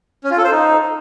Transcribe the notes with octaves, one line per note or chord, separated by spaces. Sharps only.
C#4
F4
A4
C5
D#4